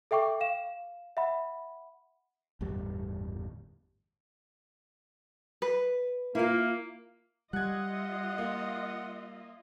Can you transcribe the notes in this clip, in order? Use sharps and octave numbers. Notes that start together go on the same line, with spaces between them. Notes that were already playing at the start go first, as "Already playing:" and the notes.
A4 E5 G5 C#6 D6
F5 E7
E5 F#5 B5
G1 E2 A2 G3
B4
A#3 E4 F4
G3 F4 D#5 E5 F#5 F#6 G#6
A#3